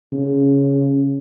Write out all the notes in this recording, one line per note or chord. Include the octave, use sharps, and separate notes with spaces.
C#3